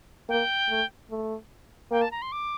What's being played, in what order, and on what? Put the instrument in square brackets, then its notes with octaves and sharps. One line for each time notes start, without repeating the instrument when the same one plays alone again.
[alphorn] A#3 [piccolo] G5
[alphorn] A3
A3
[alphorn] A#3 [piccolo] G5
[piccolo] A5
A#5
C6
D6